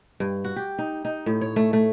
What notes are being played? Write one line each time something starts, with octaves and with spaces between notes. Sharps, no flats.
G2
F#4
G4
D#4
D#4
A2
C#5
A3
A3